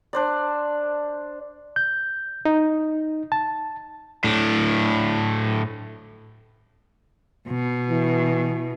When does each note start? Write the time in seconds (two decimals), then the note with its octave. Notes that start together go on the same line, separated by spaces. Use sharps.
0.13 D4 C5 D5
1.76 G6
2.45 D#4
3.32 A5
4.24 A2 D4
7.48 B2
7.90 E3